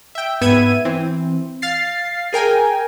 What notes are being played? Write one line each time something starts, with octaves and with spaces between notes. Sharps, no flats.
E5 G5
G#2 B3 E5 G#6 D#7
E3 C4
F5 A6 C7
G#4 A#4 G5 G#5